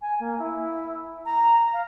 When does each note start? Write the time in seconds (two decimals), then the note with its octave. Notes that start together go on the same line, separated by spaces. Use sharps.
0.02 G#5
0.20 A#3
0.39 E4
1.26 A#5
1.73 F5